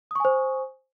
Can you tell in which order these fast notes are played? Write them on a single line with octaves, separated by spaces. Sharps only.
D#6 C#6 G#5 C5